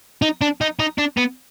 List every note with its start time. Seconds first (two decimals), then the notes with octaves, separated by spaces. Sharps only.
0.22 D#4
0.41 D4
0.61 D#4
0.79 D#4
0.98 D4
1.17 B3